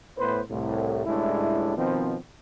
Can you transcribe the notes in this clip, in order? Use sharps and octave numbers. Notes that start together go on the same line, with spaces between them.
A2 B3 B4 C5
C2 A2
C#2 A2 G3 G#3 D4 E4
B2 D#3 F3 B3 C4